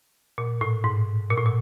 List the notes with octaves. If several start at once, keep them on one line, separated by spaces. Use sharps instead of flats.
A#2
A2
G#2
A#2
A2
A#2